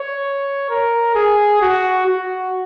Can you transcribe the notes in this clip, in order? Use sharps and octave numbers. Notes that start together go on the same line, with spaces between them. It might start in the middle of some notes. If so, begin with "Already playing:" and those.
Already playing: C#5
A#4
G#4
F#4
F#4